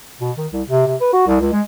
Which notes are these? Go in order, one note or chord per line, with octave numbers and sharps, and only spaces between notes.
B2
D#3
C2
C3
C3
B4
F#4
C2
C#2
G#3